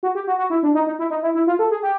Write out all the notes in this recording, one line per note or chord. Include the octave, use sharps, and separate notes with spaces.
F#4
G4
F#4
F#4
E4
D4
D#4
D#4
E4
D#4
E4
E4
F4
A4
G#4
G4